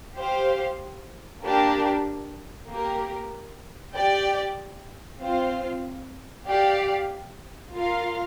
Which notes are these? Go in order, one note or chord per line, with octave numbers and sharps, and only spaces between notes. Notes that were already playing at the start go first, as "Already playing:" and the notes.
G4 C5 F5
A#3 D4 G4 A#4
A#3 G4 A#4
G4 D5 G5
C4 F4 C5 F5
G4 D5 F5
F4 A#4 F5